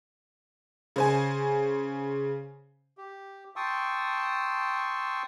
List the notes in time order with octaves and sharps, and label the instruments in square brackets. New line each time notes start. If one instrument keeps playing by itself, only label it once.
[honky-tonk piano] C#3 C5 G#5
[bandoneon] G4
G5 A5 C6 C#6 D#6 E6